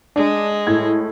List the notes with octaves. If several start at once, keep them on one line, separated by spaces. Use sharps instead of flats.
G#3 D4
A2 G#6